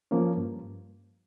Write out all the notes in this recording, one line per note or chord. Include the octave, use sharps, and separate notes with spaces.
F3 A#3 C#4
G2